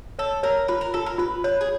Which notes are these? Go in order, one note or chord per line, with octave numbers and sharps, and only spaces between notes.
A4 C#5
A#4 C#5
F4 B4
A#4
F4 A4
A#4
F4 B4
B4 C#5
G#4